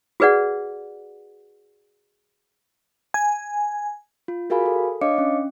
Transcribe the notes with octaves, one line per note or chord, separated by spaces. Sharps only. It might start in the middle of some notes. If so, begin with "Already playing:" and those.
F#4 G#4 B4 D5 F#5
G#5
F4
F#4 G#4 A#4 F5 G#5 B5
A4
D4 C#5 D#5 F5 D6 C#7
C#4